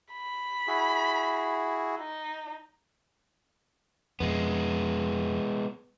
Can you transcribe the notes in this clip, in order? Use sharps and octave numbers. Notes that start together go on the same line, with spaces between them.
B5
E4 F#4 G#4
D#4
F2 B2 G#3 B3